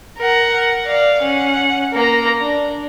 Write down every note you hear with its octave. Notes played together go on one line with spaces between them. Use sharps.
A#4 F#5
D5 F5
C#4 F#5
A#3 A#5
D4